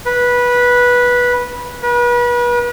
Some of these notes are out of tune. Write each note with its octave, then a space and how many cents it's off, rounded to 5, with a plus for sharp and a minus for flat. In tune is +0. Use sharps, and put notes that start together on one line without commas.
B4 -15
B4 -35